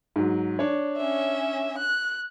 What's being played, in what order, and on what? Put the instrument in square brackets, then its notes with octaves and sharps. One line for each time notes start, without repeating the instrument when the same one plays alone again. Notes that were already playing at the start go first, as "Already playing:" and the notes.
[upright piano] G#2 F#3
D4 C#5
[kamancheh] C#4 E5
F#6